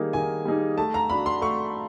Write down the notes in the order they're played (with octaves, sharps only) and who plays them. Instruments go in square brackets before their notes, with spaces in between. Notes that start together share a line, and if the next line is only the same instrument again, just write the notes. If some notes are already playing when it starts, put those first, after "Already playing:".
Already playing: [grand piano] D#3 G3 A#3 D#4 G#4
[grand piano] D#3 [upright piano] G#5
[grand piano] G3 A#3 D#4 G#4
[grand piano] A3 [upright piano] A5
[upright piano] A#5
[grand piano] D4 F#4 [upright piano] B5
[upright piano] C6
[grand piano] A3 [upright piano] C#6